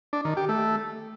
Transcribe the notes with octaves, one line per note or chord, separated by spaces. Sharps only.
D4
D#3
G4
A3